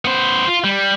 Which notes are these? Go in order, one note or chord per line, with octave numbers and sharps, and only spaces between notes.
B3 C5
F4
G3